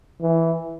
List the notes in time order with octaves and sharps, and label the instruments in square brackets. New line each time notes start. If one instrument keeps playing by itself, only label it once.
[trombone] E3